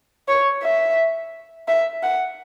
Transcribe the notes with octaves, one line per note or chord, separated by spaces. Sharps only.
C#5
E5
E5
F#5